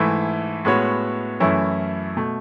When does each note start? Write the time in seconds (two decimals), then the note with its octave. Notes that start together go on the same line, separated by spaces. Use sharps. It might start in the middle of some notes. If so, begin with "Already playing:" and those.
Already playing: G#2 E3 A3 E4
0.65 A2 G#3 B3 F#4 C#5
1.40 F#2 E3 A3 C#4 E4
2.17 B2 A3